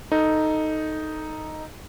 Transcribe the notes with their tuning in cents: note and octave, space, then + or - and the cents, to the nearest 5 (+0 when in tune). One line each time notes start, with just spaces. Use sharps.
D#4 +0 A4 +0